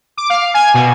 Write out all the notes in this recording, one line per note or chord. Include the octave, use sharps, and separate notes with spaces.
D6
F5
G#5
B2